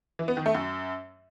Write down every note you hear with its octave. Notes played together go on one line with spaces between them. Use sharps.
E3
B3
D#3
A3
F#2